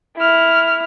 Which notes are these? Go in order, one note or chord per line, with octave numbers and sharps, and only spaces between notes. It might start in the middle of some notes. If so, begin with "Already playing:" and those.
E4 F6